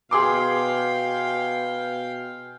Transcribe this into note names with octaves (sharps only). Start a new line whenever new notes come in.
B2 G#4 F5 G5 C6 D6